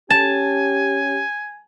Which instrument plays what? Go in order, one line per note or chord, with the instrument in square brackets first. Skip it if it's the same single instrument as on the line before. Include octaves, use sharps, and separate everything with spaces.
[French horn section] C#4 G4 [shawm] G#5 [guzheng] A5